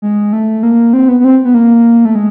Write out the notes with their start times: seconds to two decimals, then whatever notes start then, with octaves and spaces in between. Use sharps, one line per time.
0.02 G#3
0.33 A3
0.63 A#3
0.93 C4
1.09 B3
1.20 B3
1.24 C4
1.45 B3
1.54 A#3
2.05 A3
2.15 G#3